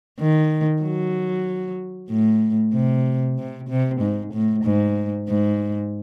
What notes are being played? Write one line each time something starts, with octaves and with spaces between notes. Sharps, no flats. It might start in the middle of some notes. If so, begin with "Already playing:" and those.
D#3
F#3
A2
C3
C3
C3
G#2
A2
G#2
G#2